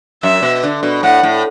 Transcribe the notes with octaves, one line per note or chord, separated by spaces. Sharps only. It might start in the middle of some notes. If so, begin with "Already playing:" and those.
F#2 E5
B2
D3
B2
A2 F#5
A2